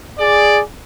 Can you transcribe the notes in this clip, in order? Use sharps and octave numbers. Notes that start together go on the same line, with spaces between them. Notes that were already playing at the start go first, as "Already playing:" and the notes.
G#4 D5